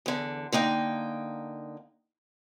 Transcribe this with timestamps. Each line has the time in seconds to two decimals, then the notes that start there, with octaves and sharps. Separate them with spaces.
0.06 E2 D3
0.52 D3 A#3 D#4 G5